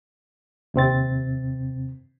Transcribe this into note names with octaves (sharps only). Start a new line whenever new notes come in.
D#2 C3 C4 A6